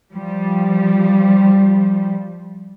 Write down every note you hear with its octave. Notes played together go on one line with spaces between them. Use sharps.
F3 G3